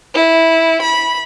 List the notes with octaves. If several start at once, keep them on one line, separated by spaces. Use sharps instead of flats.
E4
B5